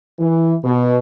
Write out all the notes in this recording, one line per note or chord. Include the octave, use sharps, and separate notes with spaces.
E3
B2